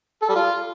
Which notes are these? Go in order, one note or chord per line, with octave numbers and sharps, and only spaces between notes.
A4
G3
F4